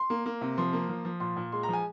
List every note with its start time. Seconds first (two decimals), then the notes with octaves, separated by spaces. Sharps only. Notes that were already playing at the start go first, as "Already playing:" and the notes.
Already playing: C6
0.10 A#3
0.26 A#3
0.41 C3
0.57 F3 C6
0.73 A#3
0.89 F3
1.05 F3
1.20 A#2 C6
1.36 A#2
1.52 G#3 C6
1.63 A#5
1.69 F3 G#5